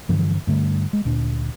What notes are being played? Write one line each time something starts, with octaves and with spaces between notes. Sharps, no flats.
G2 D3 E3 F3
G2 D3 A3
G#3
D2 A#2 D4